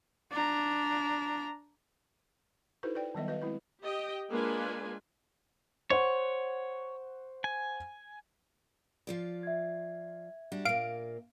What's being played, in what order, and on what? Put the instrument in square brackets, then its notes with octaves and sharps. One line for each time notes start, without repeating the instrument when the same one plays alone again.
[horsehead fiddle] D4 A#5
[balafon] D#4 E4 F#4 A4 B4 C5
B4 D5 G5
D#3 F#3 G3 B3 D#5 E5
F#4 B4 D#5 F5
G#3 C4 E4 B4
[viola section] G4 D#5 G5
G#3 A#3 D4 F4 B4 G#5
[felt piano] C5 F#5 C#6 [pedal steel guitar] C#5
[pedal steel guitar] G#5
[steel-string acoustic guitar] F3 F4 D5
[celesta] E5 G#6
[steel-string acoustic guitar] G3 D4 F#4
[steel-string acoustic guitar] A#2 A#3 [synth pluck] F5 D7